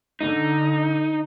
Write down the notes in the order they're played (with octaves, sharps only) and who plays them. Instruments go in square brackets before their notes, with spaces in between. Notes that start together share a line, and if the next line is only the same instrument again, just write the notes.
[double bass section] D3 [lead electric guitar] D#4